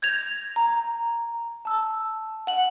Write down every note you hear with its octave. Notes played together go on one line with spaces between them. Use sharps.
G6 G#6 A#6 F7
A#5
A5 E6
F#5 F#7